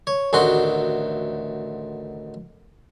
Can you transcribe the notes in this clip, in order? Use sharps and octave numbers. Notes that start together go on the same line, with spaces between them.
C#5
A1 D2 D#3 C4 F#4 C6